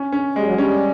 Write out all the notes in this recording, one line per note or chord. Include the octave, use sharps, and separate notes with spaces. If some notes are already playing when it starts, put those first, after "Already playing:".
Already playing: C#4
C#4
G3 G#3
F#3
G3 C#4